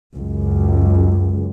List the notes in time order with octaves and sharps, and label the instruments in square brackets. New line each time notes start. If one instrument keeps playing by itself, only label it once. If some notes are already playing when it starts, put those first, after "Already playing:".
[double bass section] C#2 F#2